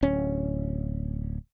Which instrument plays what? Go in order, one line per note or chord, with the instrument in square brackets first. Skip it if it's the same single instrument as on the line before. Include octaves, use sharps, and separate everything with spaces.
[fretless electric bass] D1 C#4